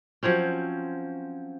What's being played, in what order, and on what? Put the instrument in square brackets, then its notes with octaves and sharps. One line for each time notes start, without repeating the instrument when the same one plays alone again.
[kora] F3 F#3 C4 C#4